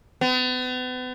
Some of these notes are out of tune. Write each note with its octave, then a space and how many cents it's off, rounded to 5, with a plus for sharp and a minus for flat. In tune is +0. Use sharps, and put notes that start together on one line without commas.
B3 +40